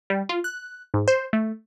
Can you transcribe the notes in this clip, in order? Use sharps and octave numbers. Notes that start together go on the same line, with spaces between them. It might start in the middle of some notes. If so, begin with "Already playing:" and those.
G3
F4
F#6
G#2
C5
A3